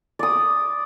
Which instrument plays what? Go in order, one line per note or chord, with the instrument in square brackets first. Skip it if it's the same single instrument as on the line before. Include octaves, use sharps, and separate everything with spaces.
[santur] D5 D#6